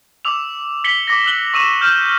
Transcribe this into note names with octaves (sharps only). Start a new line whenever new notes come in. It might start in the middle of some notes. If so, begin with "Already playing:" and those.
D6 E6 F7
B6 C#7 F#7 G7
D6 A#6
E6 F#6 F#7 G7
C#6 E6 D#7 E7
F6 G6 E7